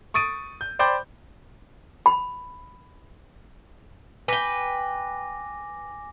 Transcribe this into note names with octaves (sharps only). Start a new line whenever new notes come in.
C#6 D#6 A6 D7 D#7
G6
C5 D5 G5 B5 D6 G6
B5
B4 G5 G#5 D6 A#6